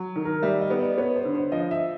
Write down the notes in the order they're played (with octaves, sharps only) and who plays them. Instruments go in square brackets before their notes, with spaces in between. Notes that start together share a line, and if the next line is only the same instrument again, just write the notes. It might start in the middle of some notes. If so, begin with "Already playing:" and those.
Already playing: [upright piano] F#3
D#3
[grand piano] A#4
[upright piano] G3 [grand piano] E5
[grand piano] D#5
[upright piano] B3
[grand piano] D5
[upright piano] B3 [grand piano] C#5
[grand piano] C5
[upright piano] D3
[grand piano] C5
[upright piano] F3 [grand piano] D#5
[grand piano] E5